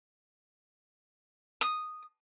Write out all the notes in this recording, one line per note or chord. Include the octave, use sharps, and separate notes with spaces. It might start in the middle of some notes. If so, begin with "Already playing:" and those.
D#6